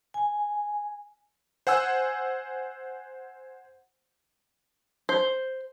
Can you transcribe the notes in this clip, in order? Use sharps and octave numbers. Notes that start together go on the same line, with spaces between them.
G#5
C5 F#5 G#5 E6
C5